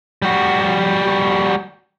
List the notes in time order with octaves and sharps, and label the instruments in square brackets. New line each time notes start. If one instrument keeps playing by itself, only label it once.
[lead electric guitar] G3 F#4